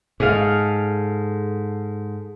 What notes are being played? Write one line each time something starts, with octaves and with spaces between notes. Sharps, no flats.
G#2 G#4 A4 F5